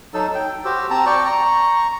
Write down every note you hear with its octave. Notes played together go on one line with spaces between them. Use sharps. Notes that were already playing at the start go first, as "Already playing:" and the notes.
F#3 D#4 A4 E6
G5
F#4 G4 C5 E6
C4 A5 A#5
D5 G5 C#6
A#5 C#6